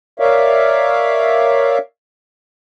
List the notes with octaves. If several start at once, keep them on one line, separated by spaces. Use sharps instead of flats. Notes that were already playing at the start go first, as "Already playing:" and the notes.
A#4 C#5 D5 E5 F5